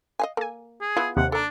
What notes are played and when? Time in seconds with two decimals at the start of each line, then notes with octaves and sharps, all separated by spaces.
0.19 D#5 F5 G#5
0.37 A#3 A4 G#5
0.81 G#4
0.97 B3 E4 F4
1.17 D#2 C3 F#5
1.32 D4 A4 A#5